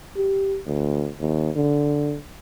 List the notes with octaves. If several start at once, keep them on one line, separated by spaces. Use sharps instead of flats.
G4
D2
D#2
D3